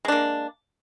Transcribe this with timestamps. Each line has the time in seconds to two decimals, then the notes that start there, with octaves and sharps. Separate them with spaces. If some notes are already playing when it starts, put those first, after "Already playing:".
0.05 G#3
0.08 D4
0.12 A#3